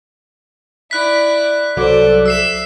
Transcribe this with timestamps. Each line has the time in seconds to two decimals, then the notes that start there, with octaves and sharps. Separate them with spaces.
0.91 E4 D5 F#6 B6
1.77 C2 F#3 A4 C5 D5 D6
2.26 E5 E6 C7 E7